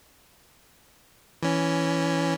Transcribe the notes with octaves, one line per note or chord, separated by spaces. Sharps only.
E3 C#4